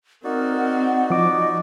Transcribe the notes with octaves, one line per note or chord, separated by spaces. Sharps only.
C4 D#4 F#4 A#4 D5
F#5
F3 D#5 D6